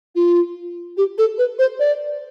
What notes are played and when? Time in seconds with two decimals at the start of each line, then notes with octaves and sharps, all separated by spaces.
0.15 F4
0.97 G4
1.18 A4
1.38 B4
1.59 C5
1.79 D5